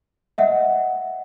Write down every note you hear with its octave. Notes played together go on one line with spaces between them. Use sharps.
D#5 E5 F#5